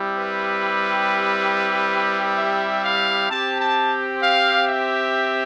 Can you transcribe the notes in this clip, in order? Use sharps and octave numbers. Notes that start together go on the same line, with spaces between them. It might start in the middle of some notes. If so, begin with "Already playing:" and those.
Already playing: G3 C4 E4 G4
B4
E5
F5
C4 G4 A5
A5
F5
E5